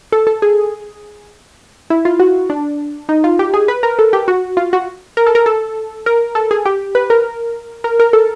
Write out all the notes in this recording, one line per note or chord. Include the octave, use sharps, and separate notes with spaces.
A4
A4
G#4
E4
F4
F#4
D4
D#4
F4
G4
G#4
B4
A#4
A4
G4
F#4
F4
F#4
A#4
A4
A#4
A4
A#4
A4
G#4
G4
B4
A#4
A#4
A#4
A4